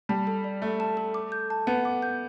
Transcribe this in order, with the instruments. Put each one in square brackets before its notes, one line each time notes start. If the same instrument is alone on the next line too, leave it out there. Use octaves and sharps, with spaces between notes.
[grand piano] G3 [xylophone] A5
[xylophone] A4
D5
[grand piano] A3 [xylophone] A4
[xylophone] A5
A4
D6
G6
A5
[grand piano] B3 [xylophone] F#5
[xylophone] D6
G6